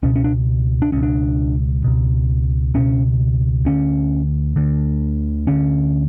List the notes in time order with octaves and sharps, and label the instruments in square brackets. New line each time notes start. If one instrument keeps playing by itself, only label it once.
[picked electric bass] C#2 B2 C#4
C#4
D4
D4
C#2 B2 C#4
D4
C#2 B2
C#2 B2 C#4
D2 D3 C#4
D2 D3
D2 D3 C#4